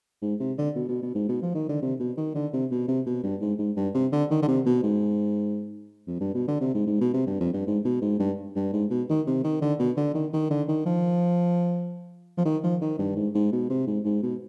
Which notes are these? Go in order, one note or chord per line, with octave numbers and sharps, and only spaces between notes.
G#2
C3
D3
B2
B2
B2
G#2
B2
F3
D#3
D3
C3
B2
D#3
D3
C3
B2
C3
B2
G2
G#2
G#2
G2
C3
D3
D#3
D3
C3
B2
G#2
F2
G2
B2
D3
C3
G#2
G#2
B2
C3
G2
F2
G2
G#2
B2
G#2
G2
G2
G#2
B2
D#3
C3
D#3
D3
B2
D3
D#3
D#3
D3
D#3
F3
F3
D#3
F3
D#3
G2
G#2
G#2
B2
C3
G#2
G#2
B2